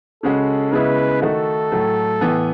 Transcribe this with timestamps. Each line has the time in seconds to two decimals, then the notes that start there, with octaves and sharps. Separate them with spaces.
0.23 C#3 G#3 C#4 F#4 A4
0.72 C#3 G#3 B3 E4 B4
1.22 D#3 A3 D#4 F#4 A4
1.72 A2 F#3 A3
2.21 A2 E3 B3